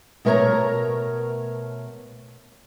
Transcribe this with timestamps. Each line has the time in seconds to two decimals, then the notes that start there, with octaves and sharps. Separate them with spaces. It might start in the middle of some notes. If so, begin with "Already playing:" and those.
0.25 B2 A3 A#4 C5 C#5 A#5